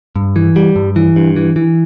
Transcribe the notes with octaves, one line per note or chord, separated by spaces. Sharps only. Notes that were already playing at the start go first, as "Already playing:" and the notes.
G2
E3
G3
G2
E3
G2
E3
E3